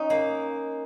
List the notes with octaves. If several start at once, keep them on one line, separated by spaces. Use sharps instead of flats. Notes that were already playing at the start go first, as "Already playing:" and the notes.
Already playing: C#4 D#4
A#3